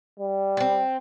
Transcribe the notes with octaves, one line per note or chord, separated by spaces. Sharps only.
G3
B3 C4